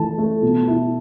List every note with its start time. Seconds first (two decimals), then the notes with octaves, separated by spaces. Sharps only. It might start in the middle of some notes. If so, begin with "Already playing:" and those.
Already playing: E3 A3 A5
0.18 A3
0.42 B2
0.67 E4